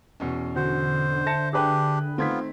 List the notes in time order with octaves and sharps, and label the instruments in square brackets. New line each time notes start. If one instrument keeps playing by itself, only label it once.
[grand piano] E2 B2 C#4
[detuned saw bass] D3 [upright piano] F#4 [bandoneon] C5
[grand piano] E5 [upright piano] A5 A#6 C#7
[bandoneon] D4 G4 [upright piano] G#4 B4 G5
[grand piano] D#3 C4 [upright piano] A3 G#6 B6 [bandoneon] B3 F4